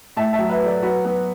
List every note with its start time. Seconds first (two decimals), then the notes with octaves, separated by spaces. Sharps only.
0.17 A2 E5 A5
0.33 E5 A5
0.39 F#3
0.50 B4 E5
0.60 F#3
0.66 A4 D5
0.82 F#3 F#4 B4
1.05 F#3 B3